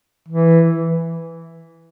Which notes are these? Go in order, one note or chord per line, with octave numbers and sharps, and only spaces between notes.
E3